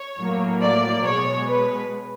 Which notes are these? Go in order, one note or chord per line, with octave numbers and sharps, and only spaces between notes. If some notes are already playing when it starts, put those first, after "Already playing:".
Already playing: C#5
A2 F#3 A#3
D5
B2 G#3 C#5
B4